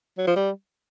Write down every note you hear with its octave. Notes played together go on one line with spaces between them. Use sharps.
F#3
F3
G3